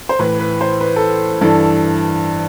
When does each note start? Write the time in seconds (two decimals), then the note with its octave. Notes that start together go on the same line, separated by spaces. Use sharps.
0.09 C5
0.19 A2 E3 B4
0.39 B4
0.61 C5
0.81 B4
0.96 A4
1.41 G2 E3 A4